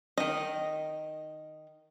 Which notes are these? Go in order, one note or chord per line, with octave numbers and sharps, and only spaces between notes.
D#3 D#5